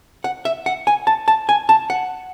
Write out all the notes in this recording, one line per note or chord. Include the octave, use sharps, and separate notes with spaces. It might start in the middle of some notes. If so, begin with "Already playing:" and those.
F#5
E5
F#5
G#5
A5
A5
G#5
A5
F#5